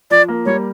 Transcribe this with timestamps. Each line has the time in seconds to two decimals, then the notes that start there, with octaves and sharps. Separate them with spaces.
0.11 F3 D5
0.28 A#3
0.46 G3 C#5